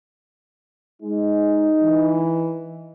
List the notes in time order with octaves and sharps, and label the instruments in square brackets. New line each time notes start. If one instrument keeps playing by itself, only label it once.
[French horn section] G#3 [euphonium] D#4
[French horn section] E3